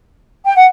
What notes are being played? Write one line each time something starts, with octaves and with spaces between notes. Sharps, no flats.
G5
F#5